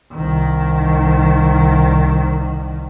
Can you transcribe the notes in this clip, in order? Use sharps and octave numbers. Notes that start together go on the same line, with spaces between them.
C2 D#3